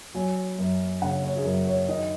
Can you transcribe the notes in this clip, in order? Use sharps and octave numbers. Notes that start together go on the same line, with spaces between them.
F#3 G#5
F#2
C#3 F#5
C#5
G#4
F#2 A#4
C#5
D#3 D#5